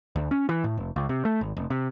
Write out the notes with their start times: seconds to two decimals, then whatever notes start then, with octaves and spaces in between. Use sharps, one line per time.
0.16 D2
0.31 C#4
0.49 E3
0.64 A2
0.78 F1
0.96 C#2
1.09 C3
1.25 A3
1.41 G#1
1.57 F1
1.70 C3